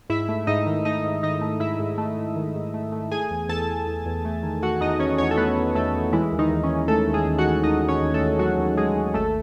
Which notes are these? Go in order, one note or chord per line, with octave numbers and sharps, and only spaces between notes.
G#2 E4 E5
A3
G#2 D#4 D#5
D#3
A3 D#4 D#5
G#2
D#3 D#4 D#5
A3
G#2 E4 E5
G#2
A3
G#2
D#3
G#2
A3
A3
A3 G#4 G#5
E2
E2 A4 A5
E2
E2
E2
A3
D#3
A3 F#4 F#5
E2 D#4 D#5
E2 C#4 C#5
E2 C#4 C#5
A4
A3 B3 B4
E2
E2 A3 A4
E2
E3 G#3 E4
D#2
D#3 D#4
D#2
C#4
G#3
G#3 A3 A4
D#2
G#3 G#4
D#2
F#4 F#5
D#3
D#2 D#4 D#5
D#3
C#4 C#5
D#2
A3 A4
D#2
D#2 F#3 F#4
D#2
D#2 G#3 G#4
D#2
G#1 A3 A4